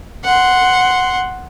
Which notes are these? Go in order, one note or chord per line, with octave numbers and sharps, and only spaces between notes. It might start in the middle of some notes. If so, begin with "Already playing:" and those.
F#5 C6